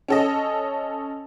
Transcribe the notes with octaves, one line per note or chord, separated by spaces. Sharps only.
C#4 A4 D#5